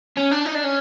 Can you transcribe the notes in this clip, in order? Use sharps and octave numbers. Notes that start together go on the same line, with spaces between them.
C#4
D4
D#4
D4
C#4